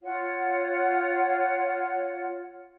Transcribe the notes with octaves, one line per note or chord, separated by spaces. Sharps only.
F4 C#5 F#5